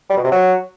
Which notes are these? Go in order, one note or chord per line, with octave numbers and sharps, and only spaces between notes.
G3
B2
C3
F#3